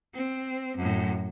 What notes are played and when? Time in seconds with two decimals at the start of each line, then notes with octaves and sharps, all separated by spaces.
0.14 C4
0.77 F#2 A2